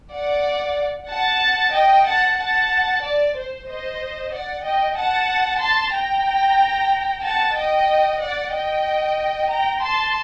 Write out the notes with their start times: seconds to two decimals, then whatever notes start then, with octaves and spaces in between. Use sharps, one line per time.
0.13 D5 F#5
1.09 F#5 A5
1.74 D#5 G5
2.06 F#5 A5
2.38 F#5 A5
3.03 D5
3.36 C5
3.68 C5 D#5
4.33 D5 F#5
4.65 D#5 G5
4.97 F#5 A5
5.62 A5 C6
5.94 G5 A#5
7.23 F#5 A5
7.56 D#5 G5
8.20 D5 F#5
8.52 D#5 G5
9.50 G5 A#5
9.82 A5 C6